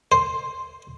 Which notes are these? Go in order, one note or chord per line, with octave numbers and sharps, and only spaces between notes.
C5